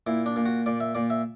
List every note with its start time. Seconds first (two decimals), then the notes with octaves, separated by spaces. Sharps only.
0.07 A#2 E4
0.26 D4
0.36 A#2
0.46 F#4
0.66 A#2 D5
0.80 E5
0.95 A#2 D5
1.10 E5